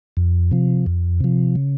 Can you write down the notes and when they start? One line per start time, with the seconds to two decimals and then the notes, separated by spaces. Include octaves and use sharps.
0.17 F2
0.51 C3 F3
0.86 F2
1.20 C3 F3
1.55 C#3